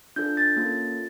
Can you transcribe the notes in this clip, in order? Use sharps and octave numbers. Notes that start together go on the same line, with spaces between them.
D4 F4 A4 G6
A6
A#3 C#4 F4 A4